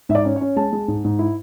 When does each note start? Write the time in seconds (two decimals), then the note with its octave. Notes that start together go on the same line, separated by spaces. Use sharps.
0.09 G#2 E5
0.15 D5
0.25 C#4
0.36 C#5
0.41 C#4
0.56 G#3 A5
0.73 G#3
0.88 G#2
1.04 G#2
1.19 E4